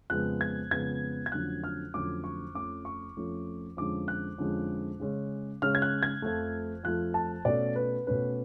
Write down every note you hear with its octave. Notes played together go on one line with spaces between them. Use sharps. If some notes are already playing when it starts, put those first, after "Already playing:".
F2 C#3 G#3 B3 F#6
G#6
F2 C#3 G#3 B3 G#6
G#6
F2 D3 F#3 A3 C#4 F#6
F6
F2 D3 F#3 A3 C#4 D6
C#6
F2 F3 A3 C#4 D6
C#6
F2 F3 A3 C#4
F2 D3 G#3 C#4 D6
F#6
F2 D3 G#3 C#4
C#3 G#3 C#4
C#3 G#3 C#4 F6
G#6
F#6
G#6
F2 F3 A3
F2 F3 A3 F#6
A5
B2 A3 C#4 D5
B4
B2 A3 C#4 B4